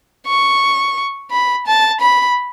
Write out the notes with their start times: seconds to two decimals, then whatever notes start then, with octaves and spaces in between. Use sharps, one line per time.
0.27 C#6
1.31 B5
1.67 A5
2.01 B5